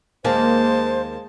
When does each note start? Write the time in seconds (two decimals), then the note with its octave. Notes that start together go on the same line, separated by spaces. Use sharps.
0.25 D#2 G#3 A#3 G#4 C5 A5